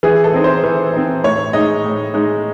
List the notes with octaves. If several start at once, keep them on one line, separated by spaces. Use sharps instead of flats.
E3 G#4
A4
C4 D#4
C5
E3
C4 D#4
A2 C#5
G#3 D#4 D#5
A2
G#3 D#4